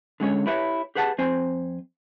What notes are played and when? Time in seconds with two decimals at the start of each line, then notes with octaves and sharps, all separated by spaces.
0.20 D3 G#3 C#4 C#5
0.47 E4 G4 B4 C#5 E5
0.95 G4 G#4 B4 F#5 G#5 A5
1.18 F2 C4 C5 G#5